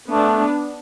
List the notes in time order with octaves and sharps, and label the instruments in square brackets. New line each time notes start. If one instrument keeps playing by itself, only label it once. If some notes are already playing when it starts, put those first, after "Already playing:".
[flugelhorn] A3 [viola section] B3 D4